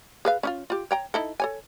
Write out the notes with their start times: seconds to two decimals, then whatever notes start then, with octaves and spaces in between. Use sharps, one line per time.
0.25 G#4 B4 F5
0.43 C#4 D#4 F4
0.70 F4 G4
0.91 C#5 G5 A#5
1.14 D#4 E4 A4
1.40 A4 C#5 G#5